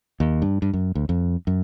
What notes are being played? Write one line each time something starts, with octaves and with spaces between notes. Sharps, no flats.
D#2
G2
G2
F#2
D2
F2
F#2